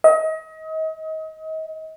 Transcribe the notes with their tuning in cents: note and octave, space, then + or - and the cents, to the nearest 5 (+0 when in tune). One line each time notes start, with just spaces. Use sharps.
D#5 +35